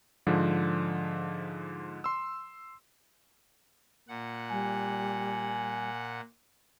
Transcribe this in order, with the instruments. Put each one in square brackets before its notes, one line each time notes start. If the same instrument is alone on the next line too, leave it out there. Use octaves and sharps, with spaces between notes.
[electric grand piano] G#2 D3 F3
C6 E6
[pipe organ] A#2 F#5
[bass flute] G3 [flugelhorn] G#5